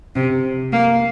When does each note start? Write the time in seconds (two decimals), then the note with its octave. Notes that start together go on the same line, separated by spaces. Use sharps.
0.16 C3
0.73 A#3